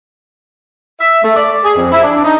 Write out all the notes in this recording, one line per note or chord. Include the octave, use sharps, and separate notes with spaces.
E5
A3
D5
G#4
F2
E4
D4
D#4